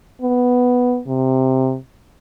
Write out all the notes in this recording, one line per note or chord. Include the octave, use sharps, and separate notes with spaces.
B3
C3